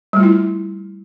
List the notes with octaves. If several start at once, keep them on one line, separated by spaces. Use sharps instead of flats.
G3 A3 E4 F4